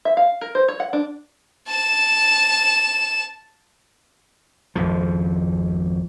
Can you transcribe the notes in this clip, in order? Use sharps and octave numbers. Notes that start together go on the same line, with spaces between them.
E5
F5
A#4
C5
C#5
F#5
D4
A5 E7
G#1 F2 F3